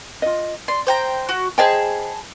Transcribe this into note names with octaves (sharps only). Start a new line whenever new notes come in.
F4 D#5
D5 C6
C5 G5 A#5
F#4
G#4 C5 D#5 G5 A5 B5